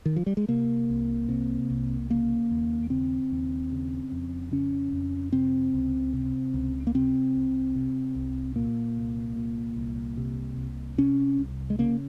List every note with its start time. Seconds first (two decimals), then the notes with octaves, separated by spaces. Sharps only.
0.06 D#3
0.16 F3
0.26 G3
0.37 G#3
0.49 C3 A#3
0.89 C2
1.29 C3
1.70 C2
2.10 C#3 A#3
2.51 D#2
2.90 C#3 C4
3.32 D#2
3.72 C#3
4.12 F2
4.52 C#3 C#4
4.93 F2
5.33 C3 C4
5.74 C#2
6.13 C3
6.54 C#2
6.87 A#3
6.94 C3 C4
7.35 C2
7.76 C3
8.15 C2
8.56 A#2 A#3
8.97 C2
9.36 A#2
9.76 C2
10.17 C3
10.57 C2
10.98 C3 C#4
11.39 C2
11.70 G#3
11.78 C#3 A#3